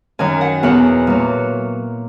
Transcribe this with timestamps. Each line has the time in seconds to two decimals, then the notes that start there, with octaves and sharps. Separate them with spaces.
0.19 F#2 D#3 F#3 G#5
0.41 F#5
0.63 E2 B2 F#3 F#5
1.07 A#2 F#3